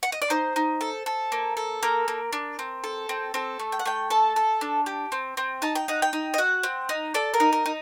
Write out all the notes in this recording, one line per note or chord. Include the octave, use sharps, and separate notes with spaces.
F#5
D#5
D5
D#4 C5
D#4
A4
A4
A#3
A4
A#3 A#4
A#3
D4
C4
A4
C4
C4 A4
A3
G5
F#5
A3 G5
A4 A5
A4
D4
G4
C4
C4
D#4 A5
G5
D#4 F#5
G5
D#4
D#5
F#4 F#5
C4
D#4
A4 D5
A#4
D#4
A#4
D#4